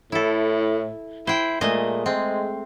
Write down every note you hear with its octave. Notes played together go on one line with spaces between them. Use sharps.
A2 E4 A4
E4 C5 G5
A#2 G#3 A3 D#5
G#3 C4